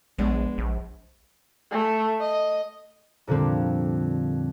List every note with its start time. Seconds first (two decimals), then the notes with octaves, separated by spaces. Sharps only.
0.18 A#1 G#3 B3 D4
0.58 A#1
1.71 A3
2.21 D#5
3.27 F2 A#2 D3 G3 C4